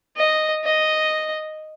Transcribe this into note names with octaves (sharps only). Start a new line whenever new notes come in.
D#5
D#5